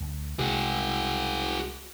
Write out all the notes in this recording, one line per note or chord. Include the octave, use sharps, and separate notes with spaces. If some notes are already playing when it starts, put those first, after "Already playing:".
D2
C2 C3 G#3 F#4 G#4